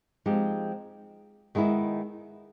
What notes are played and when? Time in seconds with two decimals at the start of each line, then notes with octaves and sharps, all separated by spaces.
0.26 F3 G#3 C4 D#4 G4
1.55 D#3 G#3 B3 E4